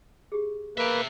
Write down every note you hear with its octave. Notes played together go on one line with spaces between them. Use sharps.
G4 G#4
A#3 B4 E5 G5